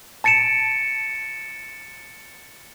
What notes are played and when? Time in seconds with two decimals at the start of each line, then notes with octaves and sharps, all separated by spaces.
0.24 A5 A6 C#7 D7 E7